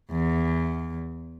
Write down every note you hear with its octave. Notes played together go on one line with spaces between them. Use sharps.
E2